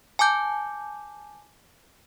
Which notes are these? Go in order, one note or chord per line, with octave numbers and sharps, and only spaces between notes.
G#5 A5 D6 G6